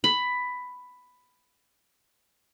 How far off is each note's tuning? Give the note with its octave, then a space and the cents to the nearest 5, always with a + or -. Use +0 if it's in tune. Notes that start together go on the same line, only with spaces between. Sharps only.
B5 +10